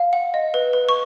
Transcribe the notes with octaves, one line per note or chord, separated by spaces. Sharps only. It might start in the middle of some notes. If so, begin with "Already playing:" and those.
Already playing: F5
F#5
D#5
B4
B4
C#6